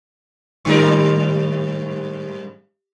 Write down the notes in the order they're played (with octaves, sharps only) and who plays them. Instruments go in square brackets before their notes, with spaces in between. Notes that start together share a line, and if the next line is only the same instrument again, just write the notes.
[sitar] G#2 G3 A#4 [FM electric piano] D#3 C#6